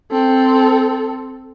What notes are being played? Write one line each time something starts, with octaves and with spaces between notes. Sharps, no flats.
C4 A4